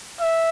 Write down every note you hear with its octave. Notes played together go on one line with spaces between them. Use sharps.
E5